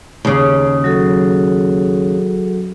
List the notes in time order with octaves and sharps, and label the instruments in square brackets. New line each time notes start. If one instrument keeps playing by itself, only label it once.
[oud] D#2 C#3
[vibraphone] F#3 F#4 A4